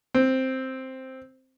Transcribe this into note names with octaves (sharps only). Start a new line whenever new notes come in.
C4